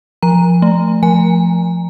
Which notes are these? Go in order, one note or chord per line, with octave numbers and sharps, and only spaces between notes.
F3 A#5
A3
F3 G#5